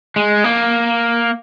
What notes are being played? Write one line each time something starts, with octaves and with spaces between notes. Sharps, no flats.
G#3
A#3